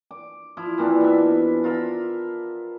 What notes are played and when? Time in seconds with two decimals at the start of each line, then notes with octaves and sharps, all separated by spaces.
0.11 D6
0.57 F3 E4
0.78 E3 A#3 C4 D4
1.01 B2 E5
1.64 F4 A#4 E5 B5